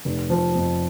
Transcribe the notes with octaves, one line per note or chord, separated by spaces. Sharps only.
F1
F3
F2